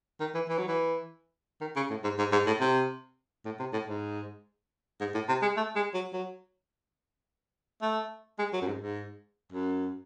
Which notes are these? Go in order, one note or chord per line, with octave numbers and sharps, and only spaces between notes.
D#3
E3
E3
F#3
E3
D#3
C#3
A2
G#2
G#2
G#2
A2
C3
A2
C3
A2
G#2
G#2
A2
C3
G#3
A3
G#3
F#3
F#3
A3
G#3
F#3
F#2
G#2
G#2
F#2